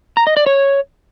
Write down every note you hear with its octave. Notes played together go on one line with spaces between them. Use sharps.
A#5
D#5
D5
C#5